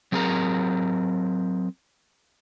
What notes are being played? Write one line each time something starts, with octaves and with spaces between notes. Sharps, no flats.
F#3 C4 G#4 A#4 A#5